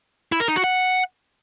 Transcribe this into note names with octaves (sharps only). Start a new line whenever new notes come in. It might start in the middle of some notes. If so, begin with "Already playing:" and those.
E4
A#4
D#4
F#4
F#5